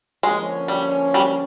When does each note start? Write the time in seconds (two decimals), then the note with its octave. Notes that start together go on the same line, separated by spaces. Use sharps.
0.23 D3 F3 G#3 A#3 C#4
0.68 G3
1.14 G3